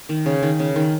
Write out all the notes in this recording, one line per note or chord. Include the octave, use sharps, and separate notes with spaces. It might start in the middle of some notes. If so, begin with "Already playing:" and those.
D#3
C#3
D#3
C#3
D#3